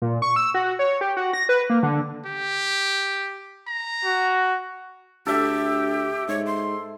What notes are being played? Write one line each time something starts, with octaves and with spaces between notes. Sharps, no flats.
A#2
C#6
E6
F#4
C#5
G4
F#4
A#6
B4
A#3
D3
G4
A#5
F#4
D2 G4 A4 E5
G#2 C#5
C6